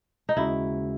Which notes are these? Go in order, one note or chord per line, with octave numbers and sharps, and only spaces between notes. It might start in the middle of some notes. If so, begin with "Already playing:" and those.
D#4
D#2 C#3 G#3 C#4 E4 F#4